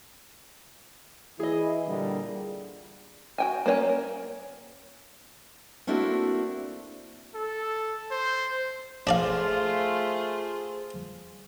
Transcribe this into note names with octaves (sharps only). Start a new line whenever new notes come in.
E3 E4 G#4 D#5
A#2 D3 G3
F#4 G5 G#5
A#3 C#4 C5 C#5 G#5
A#4
A3 A#3 C4 D4 E4 F#4
A4
C5
A3 D4 F4 G#4 C5 D5 F5